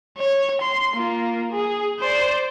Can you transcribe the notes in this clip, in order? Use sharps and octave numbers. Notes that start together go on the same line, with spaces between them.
C#5
C6
A#3 F4
G#4
C5 D5